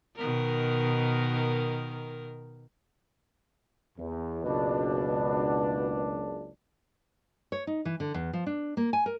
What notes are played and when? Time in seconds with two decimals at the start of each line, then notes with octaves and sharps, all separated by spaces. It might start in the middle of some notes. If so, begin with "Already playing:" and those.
0.16 B2 D#3 A#4
3.98 E2
4.44 F#1 C#2 B2 D4
7.52 C#5
7.67 D#4
7.85 E3
8.00 D3
8.14 E2
8.33 F3
8.46 D4
8.77 A#3
8.93 G#5
9.06 A#4